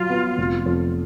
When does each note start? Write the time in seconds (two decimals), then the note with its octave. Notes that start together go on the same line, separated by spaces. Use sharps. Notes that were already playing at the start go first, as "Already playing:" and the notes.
Already playing: F#3 F4
0.10 B3
0.38 F1
0.66 F2